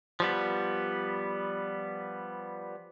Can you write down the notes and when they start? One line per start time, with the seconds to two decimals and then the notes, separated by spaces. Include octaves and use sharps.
0.20 F3 G3 B3